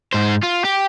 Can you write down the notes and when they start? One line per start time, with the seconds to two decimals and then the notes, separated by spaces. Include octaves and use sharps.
0.13 G#2 C5
0.43 F4
0.65 G4